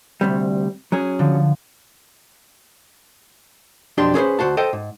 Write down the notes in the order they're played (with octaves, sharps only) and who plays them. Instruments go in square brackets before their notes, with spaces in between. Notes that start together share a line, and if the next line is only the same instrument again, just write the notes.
[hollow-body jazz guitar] D2 C3 G3
F#3 C#4 G#4
[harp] D3 F3
[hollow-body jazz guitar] B1 F2 D4 G4 C6
C#4 G#4 A4 B4 C5
D2 B2 F#4 C5 A5
A4 C5 D#5 G5
G#2